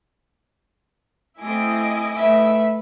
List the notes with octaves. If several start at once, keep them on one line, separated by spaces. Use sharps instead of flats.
A3 C4 E4 D#5 G#5 D6
A3 B4 E5